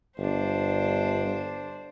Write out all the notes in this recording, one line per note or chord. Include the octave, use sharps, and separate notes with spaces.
G1 D4 C5